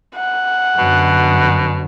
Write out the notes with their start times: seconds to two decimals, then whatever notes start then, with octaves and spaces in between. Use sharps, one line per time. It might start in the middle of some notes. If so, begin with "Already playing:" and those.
0.16 F#5
0.78 F#2 B2 D3